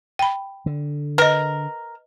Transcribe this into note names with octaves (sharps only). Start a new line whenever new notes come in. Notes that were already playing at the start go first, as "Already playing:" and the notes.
G5 B5
D3
A#4 B4 D#5